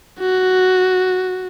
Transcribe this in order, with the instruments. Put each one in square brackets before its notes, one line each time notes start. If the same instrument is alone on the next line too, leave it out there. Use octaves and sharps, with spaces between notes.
[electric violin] F#4